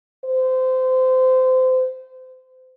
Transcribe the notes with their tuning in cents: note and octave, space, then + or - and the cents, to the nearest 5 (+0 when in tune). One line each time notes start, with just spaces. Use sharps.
C5 -25